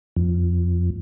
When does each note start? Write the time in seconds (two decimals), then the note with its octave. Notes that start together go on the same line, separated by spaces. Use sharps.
0.16 F2